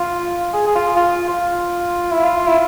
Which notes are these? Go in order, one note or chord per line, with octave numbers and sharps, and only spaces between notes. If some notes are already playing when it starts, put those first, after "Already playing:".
Already playing: F4
G#4
G#4
F4
F4
F4
E4
F4
E4